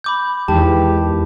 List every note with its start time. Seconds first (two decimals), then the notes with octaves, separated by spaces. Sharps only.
0.04 B5 D6 G6
0.48 E2 D#3 E3 G#3 G4 A5